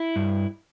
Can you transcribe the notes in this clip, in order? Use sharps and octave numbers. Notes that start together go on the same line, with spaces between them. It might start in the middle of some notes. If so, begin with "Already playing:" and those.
Already playing: E4
G2